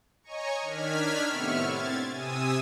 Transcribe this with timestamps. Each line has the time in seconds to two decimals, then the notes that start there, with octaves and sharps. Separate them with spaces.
0.23 C#5 D#5 G#5 A#5 C#6
0.62 D#3 D4 F6 G#6 B6
1.29 A2 C3 B3 E5 C#6 F6
1.62 C4 G#6 A6
2.11 C3 G#5 D#6 E6